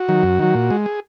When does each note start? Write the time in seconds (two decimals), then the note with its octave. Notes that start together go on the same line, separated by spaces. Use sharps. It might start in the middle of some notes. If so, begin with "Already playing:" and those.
Already playing: F#4
0.08 D#3 F#3
0.23 F#2
0.39 D#3 F#3
0.55 A#2
0.70 G#3
0.86 G#4